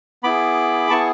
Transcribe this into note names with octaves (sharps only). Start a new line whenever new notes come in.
B3 E4 G#4 B5 D6
B3 E4 G#4 A5 C#6